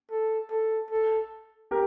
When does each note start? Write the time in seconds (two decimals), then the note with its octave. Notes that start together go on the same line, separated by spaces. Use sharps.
0.10 A4
0.50 A4
0.91 A4
1.71 G4 A#4